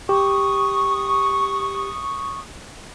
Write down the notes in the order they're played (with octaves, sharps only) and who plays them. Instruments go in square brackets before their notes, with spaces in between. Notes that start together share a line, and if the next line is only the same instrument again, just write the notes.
[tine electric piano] G4 [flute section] C#6 D#6